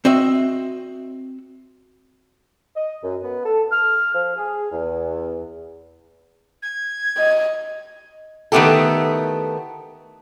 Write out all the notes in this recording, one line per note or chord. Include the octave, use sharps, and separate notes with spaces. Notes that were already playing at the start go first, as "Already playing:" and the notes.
C4 F#4 D#5 E5
D#5
F#2
B3
A4
F6
F3
G#4
E2
G#6
D#5
D#3 A3 B3 E4 G4 A4